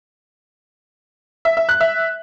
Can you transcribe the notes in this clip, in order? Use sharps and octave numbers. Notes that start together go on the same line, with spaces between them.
E5
E5
F#6
E5